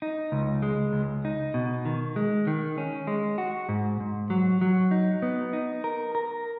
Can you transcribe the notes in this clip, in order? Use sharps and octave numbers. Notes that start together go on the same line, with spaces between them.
D#4
C#2
G#3
C#2
D#4
B2
D#3
G#3
D#3
C#4
G#3
F#4
G#2
G#2
F#3
F#3
D#4
B3
D#4
A#4
A#4